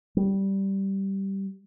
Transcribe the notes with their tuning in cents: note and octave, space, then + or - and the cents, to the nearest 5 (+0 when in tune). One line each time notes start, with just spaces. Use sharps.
G3 -10